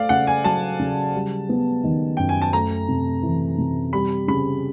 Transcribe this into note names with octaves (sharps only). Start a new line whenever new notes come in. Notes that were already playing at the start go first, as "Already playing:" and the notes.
Already playing: A3 D5 F5
C#3 F#5
G#5
F#3 A5
C#3
G3
B3
D#3
F#2 G5
G#5
A5
A3 A#5
C3
E3
C3
G3 B5
C#3 B5